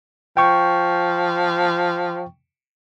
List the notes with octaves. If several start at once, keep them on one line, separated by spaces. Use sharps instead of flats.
F3 G5 C#6